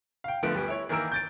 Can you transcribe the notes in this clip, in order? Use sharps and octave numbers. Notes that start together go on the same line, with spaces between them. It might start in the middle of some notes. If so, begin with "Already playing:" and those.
F5 G5
D3 F3 A3 B3 F#6 D7
D2 G3 B3
E4 C#5
D#3 E3 A#3 A#4 E6 D7
G6 A6 D7